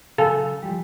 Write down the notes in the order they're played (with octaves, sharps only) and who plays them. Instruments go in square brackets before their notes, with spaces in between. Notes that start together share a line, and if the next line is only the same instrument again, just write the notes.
[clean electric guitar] C#3 F#3 F#4 [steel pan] A4 [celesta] F5 G#5
[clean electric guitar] F3 G3 G4